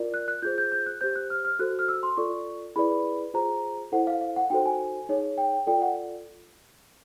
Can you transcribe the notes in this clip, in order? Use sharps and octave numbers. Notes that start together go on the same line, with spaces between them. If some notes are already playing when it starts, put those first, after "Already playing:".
Already playing: F4 A#4 D5
F#6
F#6
F4 G#4 C5 G6
G6
G6
F#6
G4 C5 G6
F#6
F6
F6
F#4 A4 C5 F#6
F6
E6
C6
F4 A4 D5 C#6
E4 G#4 B4 D5 B5
F4 G#4 C5 A#5
E4 A4 C5 F#5
F5
F5
F#5
D#4 F#4 A4 C5 G5
G#5
D#4 G#4 C#5
G5
F4 A4 D5 G5
F#5